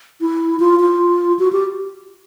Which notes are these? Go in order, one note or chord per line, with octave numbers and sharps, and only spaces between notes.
E4
F4
F4
F#4
G4